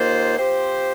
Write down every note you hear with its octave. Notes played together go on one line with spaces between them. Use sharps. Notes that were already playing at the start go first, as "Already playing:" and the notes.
Already playing: D#2 D#3 A#3 F4 C5
F3 C4 G4 C5